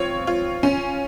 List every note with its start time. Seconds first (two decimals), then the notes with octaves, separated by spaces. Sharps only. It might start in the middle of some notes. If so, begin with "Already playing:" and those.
Already playing: C4 F4 C#5
0.27 F4
0.63 C#4